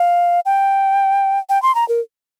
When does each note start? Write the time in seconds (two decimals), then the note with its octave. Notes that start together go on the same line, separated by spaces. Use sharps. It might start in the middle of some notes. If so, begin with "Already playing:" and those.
Already playing: F5
0.46 G5
1.49 G5
1.62 C6
1.75 A#5
1.89 A#4